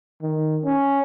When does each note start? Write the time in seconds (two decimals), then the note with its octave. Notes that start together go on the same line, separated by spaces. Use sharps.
0.22 D#3
0.65 C#4